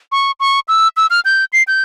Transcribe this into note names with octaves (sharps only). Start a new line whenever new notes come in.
C#6
C#6
E6
E6
F6
G6
C7
G6